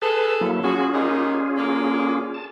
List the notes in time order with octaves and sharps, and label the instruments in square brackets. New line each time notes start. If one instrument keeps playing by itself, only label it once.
[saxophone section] G#4 A4 [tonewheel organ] B4 A5
[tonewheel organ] F#3 A#3 E4
[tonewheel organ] C#4 F4 G#4 [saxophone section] F#4
[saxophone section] A#2 G3 D#4
D3 A#3
[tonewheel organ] A5